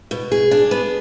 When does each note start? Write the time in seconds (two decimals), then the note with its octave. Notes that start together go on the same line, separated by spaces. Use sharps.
0.11 B2
0.32 G#4
0.51 D4
0.71 B3